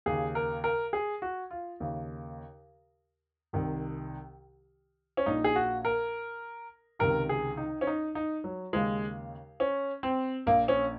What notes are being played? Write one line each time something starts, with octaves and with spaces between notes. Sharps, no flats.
D#2 C#3 G#4
A#4
A#4
G#4
F#4
F4
D#2 C#3
C2 C3 D#3
C#4
A#1 A#2 D#4
G#4
F#4
A#4
C#2 C3 D#3 A#4
G#4
D#4
C#4
D#4
D#4
F#3
D#2 C#3 G#3
C#4
C4
A#1 A#2 A#3
C#4